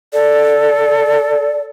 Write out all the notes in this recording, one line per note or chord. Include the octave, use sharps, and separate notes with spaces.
A4 D5